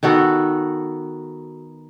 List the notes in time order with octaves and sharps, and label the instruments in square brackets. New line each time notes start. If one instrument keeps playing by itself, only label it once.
[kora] D#3 B3 F#4 A4